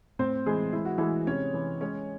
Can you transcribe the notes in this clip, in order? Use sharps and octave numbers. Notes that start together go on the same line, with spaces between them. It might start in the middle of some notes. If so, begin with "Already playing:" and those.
A2 C4 C5
E3 G#3 G#4
G#3 E4
F#4
E3 G#3 E4
C3 C#4 C#5
E3
G#3 C#4 C#5